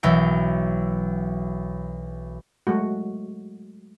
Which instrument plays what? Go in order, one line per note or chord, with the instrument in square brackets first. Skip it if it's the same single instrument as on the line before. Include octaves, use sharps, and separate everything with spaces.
[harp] B1 E3 F#3 E4 G5
[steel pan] F#3 G#3 A3 F#4